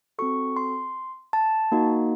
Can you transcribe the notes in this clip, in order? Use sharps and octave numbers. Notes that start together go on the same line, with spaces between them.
C4 F#4 A4 C#6
C6
A5
A#3 D#4 F#4